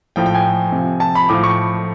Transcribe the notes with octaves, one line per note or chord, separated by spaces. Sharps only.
A2 F3 G5
G5
G#5
C3
F3
A5
B5
A2 F3 D6
C#6